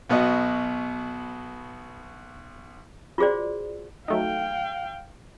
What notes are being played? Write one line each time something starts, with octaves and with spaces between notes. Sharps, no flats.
B1 B3 F#4 D#5 F#5
F4 F#4 G#4 C5 D5
F#3 A3 D#4 F5 G5